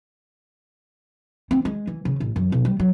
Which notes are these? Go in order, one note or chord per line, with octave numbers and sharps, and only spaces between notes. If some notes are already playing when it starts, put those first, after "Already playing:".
C4
G#3
E3
C#3
A1
F#2
B1
G3
F#3